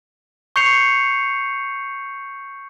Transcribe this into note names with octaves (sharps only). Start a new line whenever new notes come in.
C#6 G6 C7 C#7 F7